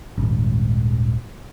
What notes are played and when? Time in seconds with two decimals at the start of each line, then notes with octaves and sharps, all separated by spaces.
0.18 D#1 G#1